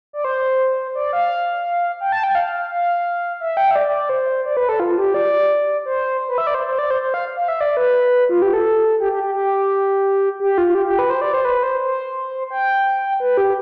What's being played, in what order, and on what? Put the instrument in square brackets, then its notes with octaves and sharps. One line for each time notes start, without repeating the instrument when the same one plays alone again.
[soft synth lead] D5
C5
D5
F5
G5
A5
G5
F5
F5
E5
G5
E5
D5
C5
D5
B4
A4
F4
G4
D5
C5
B4
E5
D5
C5
C5
D5
C5
C5
F5
F5
E5
D5
B4
F4
G4
A4
G4
G4
G4
G4
G4
F4
G4
G4
B4
C5
D5
C5
B4
C5
C5
G5
B4
G4